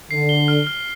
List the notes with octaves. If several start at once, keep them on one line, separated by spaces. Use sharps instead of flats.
D3 C7
G7
F6
F6